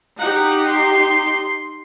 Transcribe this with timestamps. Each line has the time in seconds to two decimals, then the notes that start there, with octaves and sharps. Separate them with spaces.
0.19 D#4 G4 F#5
0.69 C6